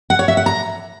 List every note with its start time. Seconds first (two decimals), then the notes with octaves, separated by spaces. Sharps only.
0.10 F#5
0.19 C#5
0.28 E5
0.37 F#5
0.46 A#5